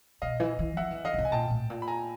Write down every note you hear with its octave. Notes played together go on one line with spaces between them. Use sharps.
B2 D#5 F5
E3
E3
F3 E5 F#5
E3
D3 D#5 F5
C#3
C3
G#5
A#2 G5 A5
A2
A#2
B5
G#5 A#5